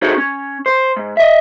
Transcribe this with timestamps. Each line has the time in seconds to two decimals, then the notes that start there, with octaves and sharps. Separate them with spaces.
0.02 D#4 F#4 G#4 A4 C5 C#5
0.18 C#4
0.66 C5
0.97 G#2
1.17 D#5 E5